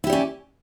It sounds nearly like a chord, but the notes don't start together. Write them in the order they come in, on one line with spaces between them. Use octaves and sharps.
E4 G4 D5 C#4